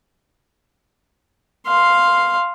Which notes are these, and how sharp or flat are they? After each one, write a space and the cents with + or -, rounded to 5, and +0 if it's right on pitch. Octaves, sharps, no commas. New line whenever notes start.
F5 +0 C6 +0